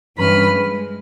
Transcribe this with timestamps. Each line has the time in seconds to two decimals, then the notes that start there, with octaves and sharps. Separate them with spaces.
0.17 G2 E3 C#4 B4 B5 F6
0.52 G#3